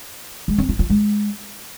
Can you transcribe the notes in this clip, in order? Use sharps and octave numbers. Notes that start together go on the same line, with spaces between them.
G#3
C4
F4
F4
G#3